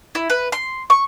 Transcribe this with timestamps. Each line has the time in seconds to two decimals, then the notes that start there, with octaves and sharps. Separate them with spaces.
0.15 E4
0.30 B4
0.52 C6
0.90 C#6